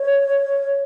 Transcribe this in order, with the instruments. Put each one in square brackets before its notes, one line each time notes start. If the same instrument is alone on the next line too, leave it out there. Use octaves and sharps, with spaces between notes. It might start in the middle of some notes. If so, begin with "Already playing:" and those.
Already playing: [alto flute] C#5